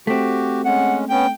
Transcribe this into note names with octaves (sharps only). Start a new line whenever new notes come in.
A3 C4 F#4 G4
G#3 C#4 F#5
B3 C#4 G5